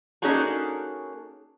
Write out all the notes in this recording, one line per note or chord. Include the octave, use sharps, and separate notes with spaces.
A#3 C#4 D#4 F#4 G#4 A4